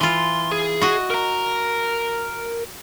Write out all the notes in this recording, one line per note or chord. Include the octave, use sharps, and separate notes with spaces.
E3 F4 C6
G#4
F#4 D#5
A#4 A#5